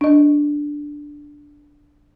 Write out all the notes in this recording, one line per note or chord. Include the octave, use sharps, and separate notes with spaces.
D4 D#5